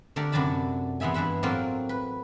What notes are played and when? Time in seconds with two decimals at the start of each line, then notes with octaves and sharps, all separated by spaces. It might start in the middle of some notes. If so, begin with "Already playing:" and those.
0.16 D3 A3 D4 G4 A#4
0.32 F#2 C3 F#3 D4 A5 B5
1.00 E3 G#3 B3 E5 G#5
1.14 G2 E4 B4 E5 F#5
1.43 A2 F#3 A#3 C4 F4 F#4
1.89 B4